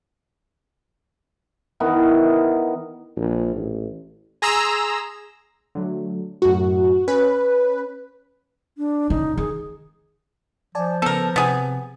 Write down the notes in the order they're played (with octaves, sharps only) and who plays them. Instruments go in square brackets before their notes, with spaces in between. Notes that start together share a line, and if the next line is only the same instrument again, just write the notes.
[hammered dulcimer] D#3 E3 B3 A#4
[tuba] A#1
A1
[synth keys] G#4 A#5 C6 E6
D3 F#3 A3
[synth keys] F#2 A2 [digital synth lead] F#4
[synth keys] C#4 [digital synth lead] B4
[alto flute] D4
[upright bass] C#3 [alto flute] D#4
[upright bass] D#3 [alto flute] G#4
[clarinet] F3 [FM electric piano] D5 G#5 A5
[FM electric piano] C#3 B3 [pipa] A4 A#4
[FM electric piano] C3 [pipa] B3 G#4